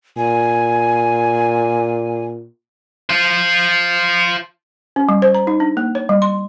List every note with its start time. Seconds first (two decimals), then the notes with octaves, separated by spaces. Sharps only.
0.17 A#2 G#5
3.10 F4 C5
4.96 C#4
5.09 G3
5.22 C5
5.35 A#5
5.47 D#4
5.60 D4
5.77 A#3
5.95 C#5
6.09 G3
6.22 C6